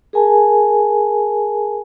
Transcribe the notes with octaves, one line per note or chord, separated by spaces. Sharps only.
G#4 A#4 G#5 A5